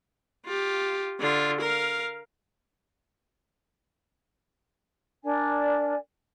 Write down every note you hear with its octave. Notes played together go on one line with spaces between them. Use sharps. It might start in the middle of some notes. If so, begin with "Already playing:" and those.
F4 G4
D3 F4
A#4 F5
D4 A#4 D5 G#5